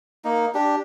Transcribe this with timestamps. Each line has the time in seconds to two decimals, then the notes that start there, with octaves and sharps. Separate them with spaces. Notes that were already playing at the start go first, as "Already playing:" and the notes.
0.25 A#3 D#4
0.54 D4 G4